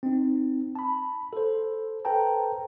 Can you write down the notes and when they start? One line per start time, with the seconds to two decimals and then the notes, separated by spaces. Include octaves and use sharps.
0.03 C4 D#4
0.75 A5 B5
1.33 A4 C5
2.05 A4 B4 C5 G5 A5 A#5